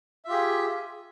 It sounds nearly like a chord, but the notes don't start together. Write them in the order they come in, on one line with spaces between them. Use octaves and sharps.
E5 F4 G4 G#4